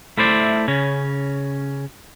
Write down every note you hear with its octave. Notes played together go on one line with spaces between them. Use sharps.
A3 E4 C5 D5
C#3 C#4